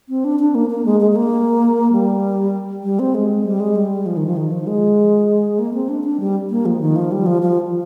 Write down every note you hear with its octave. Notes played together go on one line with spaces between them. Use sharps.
C4
D4
D4
A#3
A#3
G#3
G#3
G#3
A#3
G3
G3
C4
G#3
G3
G#3
G3
F3
D#3
F3
D#3
F3
G#3
A#3
C4
D4
D4
G3
A#3
F3
D#3
F3
G3
F3
F3